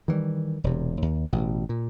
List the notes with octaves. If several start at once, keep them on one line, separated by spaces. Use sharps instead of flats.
D#3 E3 F#3 G3
E1 C3
D#2
A1 B2
A#2